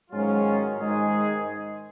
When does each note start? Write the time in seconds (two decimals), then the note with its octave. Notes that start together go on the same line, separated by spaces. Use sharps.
0.11 G#2 D#3 F#3 C#4 F4
0.78 G#2 D#3 G#3 D#4 G#4